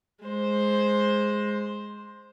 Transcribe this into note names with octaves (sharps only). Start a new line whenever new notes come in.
G#3 C5